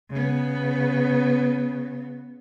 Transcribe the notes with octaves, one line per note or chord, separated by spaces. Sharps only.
C#3 B3